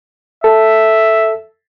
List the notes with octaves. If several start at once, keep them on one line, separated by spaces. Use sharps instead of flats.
A4 E5